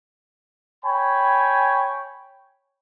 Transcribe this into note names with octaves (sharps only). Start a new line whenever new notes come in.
C#5 G5 G#5 B5